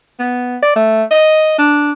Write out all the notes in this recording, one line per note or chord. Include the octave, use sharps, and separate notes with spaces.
B3
D5
A3
D#5
D4